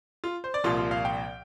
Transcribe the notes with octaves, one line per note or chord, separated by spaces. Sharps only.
F4
C5
D5
C2 A#2 F3 F4
F4
F5
G5